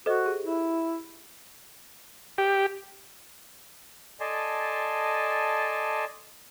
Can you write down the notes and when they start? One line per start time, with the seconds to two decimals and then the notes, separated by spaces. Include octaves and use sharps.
0.06 F#4 A4 C5 D#5
0.26 G4 G#4
0.44 E4
2.38 G4
4.20 A4 D5 D#5 G#5 A5 C6